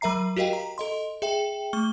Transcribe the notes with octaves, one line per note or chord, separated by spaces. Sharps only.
F#3 A#4 E5 A#5 C7
F#4 G4 A#4 D#5 F5 G5
A#5
A4 D#5 C6
G#4 E5 G5
A3 C#6 F6 G7